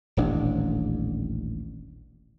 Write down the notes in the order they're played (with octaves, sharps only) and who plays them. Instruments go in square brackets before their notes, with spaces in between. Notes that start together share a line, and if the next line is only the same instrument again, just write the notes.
[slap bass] D#1 A1 D4